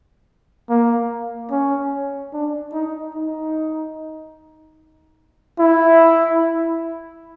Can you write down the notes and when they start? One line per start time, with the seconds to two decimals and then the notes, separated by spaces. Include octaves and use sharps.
0.69 A#3
1.51 C#4
2.33 D4
2.73 D#4
3.15 D#4
5.59 E4